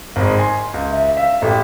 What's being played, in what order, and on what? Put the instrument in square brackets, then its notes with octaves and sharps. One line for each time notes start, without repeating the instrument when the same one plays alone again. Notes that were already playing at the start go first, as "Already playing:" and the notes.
[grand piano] G#1 G#3
G#5 C6
C#2
[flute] E5
[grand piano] E5 [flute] F5
[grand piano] A1 G4 [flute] A4